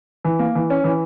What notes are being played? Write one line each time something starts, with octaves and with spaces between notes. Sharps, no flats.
E3
A#3
E3
C#4
E3